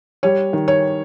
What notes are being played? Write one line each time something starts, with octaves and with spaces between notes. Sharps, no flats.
G3 C#5
D#3
C#5